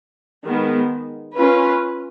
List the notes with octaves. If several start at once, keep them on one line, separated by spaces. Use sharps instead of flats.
D#3 G#3 B3
C#4 F4 B4